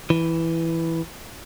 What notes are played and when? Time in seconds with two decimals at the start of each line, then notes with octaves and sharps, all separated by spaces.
0.10 E3